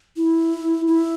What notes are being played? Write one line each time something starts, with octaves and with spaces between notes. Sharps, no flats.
E4
E4